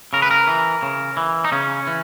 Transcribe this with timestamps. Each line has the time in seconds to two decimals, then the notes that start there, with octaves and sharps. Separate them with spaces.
0.13 C#3 A#4
0.22 B4
0.31 A#4
0.48 E3
0.82 C#3
1.17 E3
1.45 D#4
1.52 C#3 C#4
1.87 E3